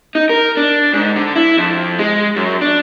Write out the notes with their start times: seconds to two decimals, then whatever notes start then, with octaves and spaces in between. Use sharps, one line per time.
0.15 D#4
0.29 A#4
0.57 D4
0.94 G#2
1.16 D3
1.36 E4
1.58 F2
1.99 G#3
2.36 F#2
2.61 D4